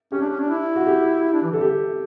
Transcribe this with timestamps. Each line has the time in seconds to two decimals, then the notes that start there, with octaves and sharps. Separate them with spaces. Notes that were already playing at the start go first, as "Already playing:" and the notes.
0.12 C#4 G4
0.21 D4
0.30 C#4
0.40 D4
0.50 E4
0.76 F#4
0.87 G4
1.33 D4
1.43 E3
1.52 D3 A4
1.61 G4